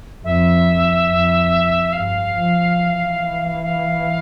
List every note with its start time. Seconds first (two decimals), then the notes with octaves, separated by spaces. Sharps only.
0.23 F2 E5
1.09 F2
1.93 G2 F5
2.34 F3
2.77 E3
3.61 F5